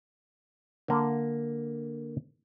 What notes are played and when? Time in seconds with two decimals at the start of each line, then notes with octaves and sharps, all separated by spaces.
0.88 D3 A#3